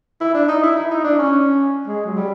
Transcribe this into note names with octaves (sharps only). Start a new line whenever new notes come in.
E4
D4
D#4
E4
E4
D#4
D4
C#4
G#3
F#3
G3